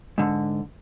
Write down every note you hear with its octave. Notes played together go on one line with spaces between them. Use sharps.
G#2 D3